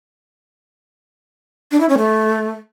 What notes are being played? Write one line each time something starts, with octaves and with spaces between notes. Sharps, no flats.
D4
E4
C#4
A3